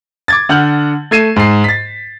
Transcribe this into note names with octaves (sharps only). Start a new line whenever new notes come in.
D6 G#6 A6
D3 F#5 F6 G6 F#7
A3 A4 G#6 C7 D#7 E7
G#2 C7
A6 B6